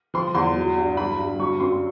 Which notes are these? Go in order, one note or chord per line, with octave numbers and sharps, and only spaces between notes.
F3 C6
E2 C6
F#3
G2
F#3 B5
G2
F#3 C#6
F#2 C6